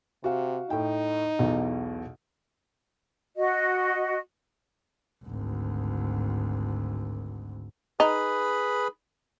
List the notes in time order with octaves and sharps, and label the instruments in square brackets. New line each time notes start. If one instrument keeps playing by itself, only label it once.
[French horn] C3 [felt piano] F#4 F5
[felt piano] A2 G5 [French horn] D#4
[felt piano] B1 E2 B2
[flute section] F#4 D#5
[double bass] G#1 D2
[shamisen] D#4 [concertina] G#4 B4 B5